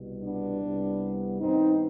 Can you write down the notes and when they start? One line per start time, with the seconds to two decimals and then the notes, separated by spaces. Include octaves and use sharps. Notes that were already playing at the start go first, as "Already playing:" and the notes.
Already playing: C2 B2 G3
0.22 B3 D4
0.61 C2 C3 G3 B3
1.40 G2 D#3 G3 B3 C4 D#4